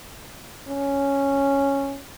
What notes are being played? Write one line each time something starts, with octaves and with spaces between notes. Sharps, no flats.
C#4